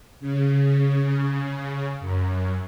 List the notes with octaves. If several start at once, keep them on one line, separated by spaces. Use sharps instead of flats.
C#3
F#2